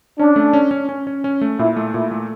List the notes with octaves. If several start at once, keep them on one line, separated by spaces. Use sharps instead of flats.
C#4 D4
A3
C#4
C#4
C#4
C#4
C#4
A3
A#2 E4
A3
A#2 E4
A3